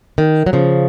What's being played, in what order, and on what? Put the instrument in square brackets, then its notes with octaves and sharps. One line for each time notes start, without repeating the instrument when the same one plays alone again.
[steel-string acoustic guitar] D#3
F#3
C#3 F3